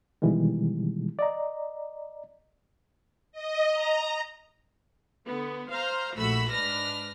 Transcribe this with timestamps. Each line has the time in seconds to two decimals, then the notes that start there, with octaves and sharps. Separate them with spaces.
0.22 B2 D#3 E3 G3 G#3
1.19 D5 D#5 A#5
3.32 D#5
3.70 A#5
5.26 D3 B3
5.70 C5 F5 A#5 C6
6.15 A#1 A3 F#4 B5 E6
6.51 G#2 D4 B4 F6 A#6